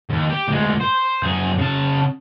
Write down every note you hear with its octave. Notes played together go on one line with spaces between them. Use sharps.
D#2
G4
D2 G#3
C5
F#2 G#4
C#3 A5